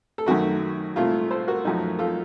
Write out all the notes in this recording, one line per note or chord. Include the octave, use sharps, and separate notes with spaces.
A4
F#2 D#3 A3 F#4
C2 A#2 A3 C4 F4 A4
A4 C5
F#4 A#4
F#2 F3 A3 D#4
F4 A4